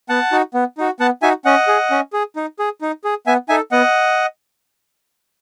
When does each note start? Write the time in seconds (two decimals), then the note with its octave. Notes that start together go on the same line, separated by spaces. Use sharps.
0.09 B3 F#5 A5
0.32 D#4 F#4
0.54 B3
0.78 D#4 F#4
1.00 B3 F#5 A5
1.22 D#4 F#4 E5 G#5
1.45 C#4 D#5 F#5
1.68 G#4
1.91 C#4
2.13 G#4
2.36 D#4
2.59 G#4
2.81 D#4
3.04 G#4
3.27 B3 E5 G#5
3.49 D#4 A4 E5 G#5
3.71 B3 D#5 F#5